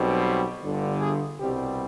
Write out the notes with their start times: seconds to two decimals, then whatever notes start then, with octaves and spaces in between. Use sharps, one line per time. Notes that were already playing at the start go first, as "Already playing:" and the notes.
Already playing: B1 B2 G3 C4
0.60 G1 G2 D3
1.00 G#4
1.40 C2 B2 G3 C4 G4